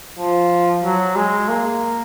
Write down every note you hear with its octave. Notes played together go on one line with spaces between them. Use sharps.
F3
F#3
G#3
A#3